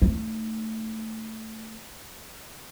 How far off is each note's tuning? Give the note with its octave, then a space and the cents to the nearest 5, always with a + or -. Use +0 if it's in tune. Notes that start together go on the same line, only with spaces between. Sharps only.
A3 +10 D#4 +0